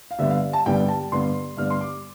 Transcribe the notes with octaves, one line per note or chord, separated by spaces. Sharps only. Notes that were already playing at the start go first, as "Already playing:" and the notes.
F5
G2 D3 G3 B3 E5
F5
A5
G2 D3 G3 B3 G5
A5
G2 D3 G3 B3 C6
G2 D3 G3 B3 F6
C6
D6